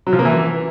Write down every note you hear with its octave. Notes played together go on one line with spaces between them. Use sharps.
F#3
F3
A#3
E3